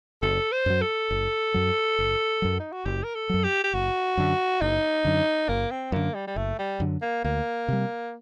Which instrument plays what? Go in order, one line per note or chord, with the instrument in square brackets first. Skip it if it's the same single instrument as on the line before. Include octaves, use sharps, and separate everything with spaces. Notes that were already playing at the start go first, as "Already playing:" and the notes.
[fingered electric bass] F#1 [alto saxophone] A4
[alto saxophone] C5
[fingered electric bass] F#2 F#3
[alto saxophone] A4
[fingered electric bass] F#1
F#2 F#3
F#1
F#2 F#3
[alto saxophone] D#4
F#4
[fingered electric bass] F#1 [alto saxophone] G4
[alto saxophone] A#4
A4
[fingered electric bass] F#2 F#3
[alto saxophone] G4
G4
[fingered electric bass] F#1 [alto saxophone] F#4
[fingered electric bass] F#2 D3
[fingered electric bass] F#1 [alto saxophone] D#4
[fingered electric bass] F#2 D3
[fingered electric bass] F#1 [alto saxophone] A#3
[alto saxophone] C4
[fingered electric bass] F#2 D3 [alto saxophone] A#3
[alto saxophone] G3
G3
[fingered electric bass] F#1 [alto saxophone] A3
[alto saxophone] G3
[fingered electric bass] F#2 D3
[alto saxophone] A#3
[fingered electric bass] D2 [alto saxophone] A#3
[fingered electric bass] C3 G3